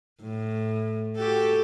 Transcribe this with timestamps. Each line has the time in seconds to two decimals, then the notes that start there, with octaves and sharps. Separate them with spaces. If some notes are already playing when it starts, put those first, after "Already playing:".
0.22 A2
1.17 F#4 G4 A4